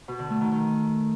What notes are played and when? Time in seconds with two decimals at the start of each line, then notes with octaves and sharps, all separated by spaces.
0.08 B2
0.19 D3
0.30 A3
0.41 D#3
0.52 D#3